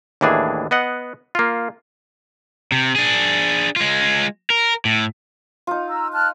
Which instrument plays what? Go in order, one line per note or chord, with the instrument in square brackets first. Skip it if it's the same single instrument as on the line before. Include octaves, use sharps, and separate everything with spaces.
[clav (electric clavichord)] D#2 A2 E3 D4 G#4
B3 D#5 F#5
A#3 F4
[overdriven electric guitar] C3
D4 G#4
G#3 F4
A#4
A2
[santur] D#4 F4
[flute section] A#5 E6
A5 F6 F#6